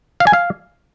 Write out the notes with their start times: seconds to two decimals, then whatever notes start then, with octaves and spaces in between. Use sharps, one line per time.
0.20 F5
0.27 G#5
0.33 F5